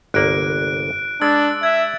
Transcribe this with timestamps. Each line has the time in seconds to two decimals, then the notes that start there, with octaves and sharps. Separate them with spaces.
0.14 G1 C2 A#3 F#6 D7
1.22 G#3 D4 E6 A6
1.63 E5 G#6